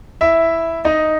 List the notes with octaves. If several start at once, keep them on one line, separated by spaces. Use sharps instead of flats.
E4 E5
D#4 D#5